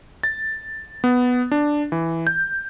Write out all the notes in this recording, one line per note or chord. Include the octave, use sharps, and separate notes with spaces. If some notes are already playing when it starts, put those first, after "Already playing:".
A6
B3
D4
E3
G6